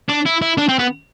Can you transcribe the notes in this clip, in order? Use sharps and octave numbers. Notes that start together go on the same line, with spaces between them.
D4
E4
E4
D4
C4
B3